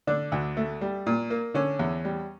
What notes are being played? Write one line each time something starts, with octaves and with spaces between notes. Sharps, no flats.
D3 D4
D2
A3
G3
A#2
A#3
D3 C#4
E2
G3